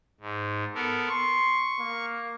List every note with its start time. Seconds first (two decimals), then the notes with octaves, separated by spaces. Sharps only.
0.20 G#2
0.75 B3 A4 A#4
1.09 C6 C#6
1.80 A#3